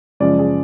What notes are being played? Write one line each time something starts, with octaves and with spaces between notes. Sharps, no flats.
F#2 C#3 F3 G#3 D5
G#4